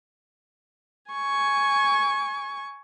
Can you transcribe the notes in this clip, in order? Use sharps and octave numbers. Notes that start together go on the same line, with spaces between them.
G#5 C#6